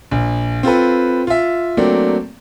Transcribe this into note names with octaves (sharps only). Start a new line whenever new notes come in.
A#1
C4 F4 A4 B4
F4 E5
F#3 A3 A#3 C4 D4